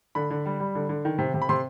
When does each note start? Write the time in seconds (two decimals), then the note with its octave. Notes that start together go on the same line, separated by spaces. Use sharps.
0.15 D3 B5
0.31 D3
0.46 G3
0.60 G3
0.75 D3
0.89 D3
1.05 D#3
1.18 C3
1.34 C3
1.42 B5
1.49 C3 C6